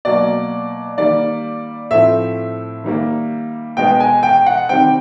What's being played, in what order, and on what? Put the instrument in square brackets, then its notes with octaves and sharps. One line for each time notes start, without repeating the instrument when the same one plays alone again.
[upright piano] B2 F#3 A#3 D5
D#3 G3 A#3 D5
A2 F3 A3 C4 E5
D#3 G3 A#3
B2 G#3 B3 G5
G#5
G5
F#5
C3 D#3 G3 C4 G5